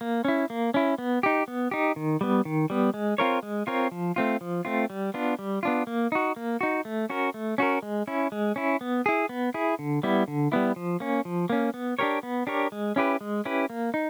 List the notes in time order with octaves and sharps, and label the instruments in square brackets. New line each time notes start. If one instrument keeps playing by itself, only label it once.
[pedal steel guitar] A#3
C#4 E4
A#3
C#4 E4
B3
D#4 G4
B3
D#4 G4
D#3
G3 B3
D#3
G3 B3
G#3
C4 F4 A#4 C#5
G#3
C4 F4 A#4 C#5
F3
A3 C4 F4
F3
A3 C4 F4
G3
B3 D4 F4
G3
B3 D4 F4
A#3
D#4 F#4
A#3
D#4 F#4
A3
C#4 F#4 A#4
A3
C#4 F#4 A#4
G#3
C#4 E4
G#3
C#4 E4
B3
E4 G#4
B3
E4 G#4
D3
G3 B3 E4
D3
G3 B3 E4
F3
A#3 C#4
F3
A#3 C#4
B3
D4 G4 A#4 C#5
B3
D4 G4 A#4 C#5
G#3
C#4 E4 G4 B4
G#3
C#4 E4 G4 B4
A#3
D#4